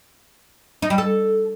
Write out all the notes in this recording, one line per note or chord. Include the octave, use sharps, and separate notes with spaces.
D#4
G3
A4